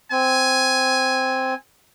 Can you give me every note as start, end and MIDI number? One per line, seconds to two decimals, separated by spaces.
0.11 1.54 60
0.11 1.57 80